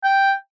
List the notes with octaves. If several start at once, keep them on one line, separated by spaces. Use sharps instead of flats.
G5